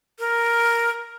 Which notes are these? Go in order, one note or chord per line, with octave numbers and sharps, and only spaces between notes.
A#4